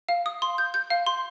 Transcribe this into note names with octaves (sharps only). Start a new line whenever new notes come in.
F5
D#6
C6
G6
G6
F5
C6